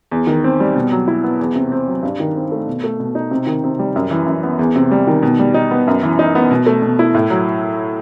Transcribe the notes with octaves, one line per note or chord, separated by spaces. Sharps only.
E2
D#3
C4
G3
B2
F#3
E4
B3
E2
C3
C4
F#3
G2
D#3
C4
A3
B2
A3
B2
D#4
C3
D#3
C3
G3
F#2
E3
F#2
B3
E2
C3
G3
D#3
B2
G3
D#4
B3
F#2
E3
D#4
B3
B2
A3
B2
E4
A2
F#3